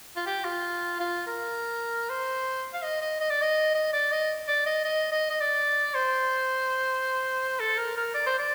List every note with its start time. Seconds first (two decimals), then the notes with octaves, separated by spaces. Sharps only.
0.16 F4
0.26 G4
0.45 F4
1.00 F4
1.26 A#4
2.10 C5
2.73 F5
2.83 D#5
3.01 D#5
3.20 D#5
3.30 D5
3.42 D#5
3.74 D#5
3.93 D5
4.12 D#5
4.48 D5
4.66 D#5
4.84 D#5
5.12 D#5
5.30 D#5
5.40 D5
5.95 C5
7.60 A4
7.78 A#4
7.97 A#4
8.14 D5
8.26 C5
8.39 D5